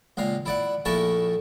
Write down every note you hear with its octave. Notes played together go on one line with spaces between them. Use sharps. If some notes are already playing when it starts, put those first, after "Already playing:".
C#2 A#2 F5 A#5
E4 D5 F#5
A#1 A3 E4 A#4 A5 C#6